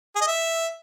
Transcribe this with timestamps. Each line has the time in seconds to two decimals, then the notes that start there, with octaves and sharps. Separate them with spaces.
0.15 G#4
0.21 D#5
0.27 E5